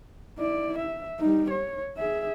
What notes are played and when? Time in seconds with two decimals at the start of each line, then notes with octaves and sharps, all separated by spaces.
0.39 E4 D5
0.78 E5
1.19 G3 D#4
1.50 C#5
1.98 G#4 E5